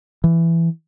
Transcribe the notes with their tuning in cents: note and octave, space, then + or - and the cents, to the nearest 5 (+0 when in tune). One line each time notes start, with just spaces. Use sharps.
E3 +15